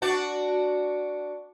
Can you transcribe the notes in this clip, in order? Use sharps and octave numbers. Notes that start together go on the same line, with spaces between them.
D4 F#4 D5